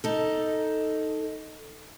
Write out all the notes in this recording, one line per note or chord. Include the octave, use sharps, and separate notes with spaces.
D#4 A4